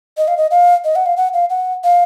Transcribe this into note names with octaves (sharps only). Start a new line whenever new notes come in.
D#5
F5
D#5
F5
D#5
F#5
F5
F#5
F5
F#5
F5